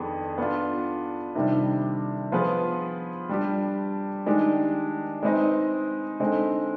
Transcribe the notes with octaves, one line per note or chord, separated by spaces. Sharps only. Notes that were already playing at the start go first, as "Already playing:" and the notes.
Already playing: F2 D#3 B3 D4 G#4
B3 D4 F4
C3 D#3 G3 D4
F3 B3 F4 G#4 B4
G3 D4 G4
D#3 G#3 D4 G4
G#3 C4 D#4 B4 D#5
D3 G#3 C4 D#4